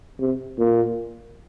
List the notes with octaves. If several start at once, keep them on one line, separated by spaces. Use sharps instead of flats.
C3
A#2